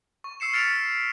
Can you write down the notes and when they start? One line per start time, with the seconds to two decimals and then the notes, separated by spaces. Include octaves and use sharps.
0.24 C#6
0.40 C#6 E6 C7 C#7 E7
0.53 F6 A6 B6 C#7 D7 F7